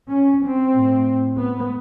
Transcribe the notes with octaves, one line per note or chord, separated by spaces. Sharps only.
C#4
C4
A2
B3